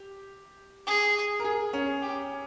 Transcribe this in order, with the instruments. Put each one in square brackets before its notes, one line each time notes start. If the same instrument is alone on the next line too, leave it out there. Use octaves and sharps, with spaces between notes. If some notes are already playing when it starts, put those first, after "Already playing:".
Already playing: [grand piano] G4
[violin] G#4
[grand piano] A#4
G#4
C#4
[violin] G4